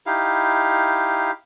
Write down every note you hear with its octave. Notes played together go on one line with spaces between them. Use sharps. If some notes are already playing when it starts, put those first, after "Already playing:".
D#4 E4 G4 F5